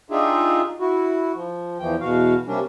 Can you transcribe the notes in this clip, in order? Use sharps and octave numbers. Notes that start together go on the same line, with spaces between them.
D4 D#4 F4 G4 G#4 E5
E4 F#4
F3
E2 E3 F3 G5
E2 B2 F#4 F5
C3 G3 A#3 C#4 D4